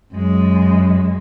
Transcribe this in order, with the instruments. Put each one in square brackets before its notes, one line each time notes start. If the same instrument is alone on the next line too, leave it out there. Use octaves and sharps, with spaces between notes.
[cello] F#2 G#3